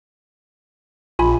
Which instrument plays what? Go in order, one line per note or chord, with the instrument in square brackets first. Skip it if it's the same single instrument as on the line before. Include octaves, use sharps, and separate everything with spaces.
[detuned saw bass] A#1 [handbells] F4 G#5 B5